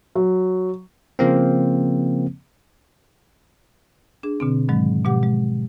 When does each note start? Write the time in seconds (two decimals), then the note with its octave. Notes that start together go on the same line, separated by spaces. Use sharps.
0.15 F#3
1.19 C#3 F3 A#3 C4
4.23 D4 G#4
4.40 B2 D3 C4
4.69 G#2 D#3 F#3 G#3
5.05 B2 F3 G#3 G4 F#5 D6
5.23 G#3